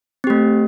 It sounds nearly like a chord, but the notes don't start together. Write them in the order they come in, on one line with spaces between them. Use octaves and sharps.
C4 G4 A3